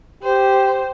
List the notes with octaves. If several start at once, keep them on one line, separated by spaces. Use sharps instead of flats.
G4 C5